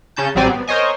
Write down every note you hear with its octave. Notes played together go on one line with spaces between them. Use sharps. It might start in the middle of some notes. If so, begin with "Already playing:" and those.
C#3 C#4 A5 G6
A1 F#3 G3 C4 D5 G#5
B3
A#4 C5 C#5 D#5 G#5